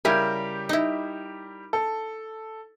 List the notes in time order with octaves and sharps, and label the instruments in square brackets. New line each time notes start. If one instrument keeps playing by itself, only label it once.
[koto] C#3 E4 G#5 [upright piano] G3 G4 A#4
[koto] D#4 E4
[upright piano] A4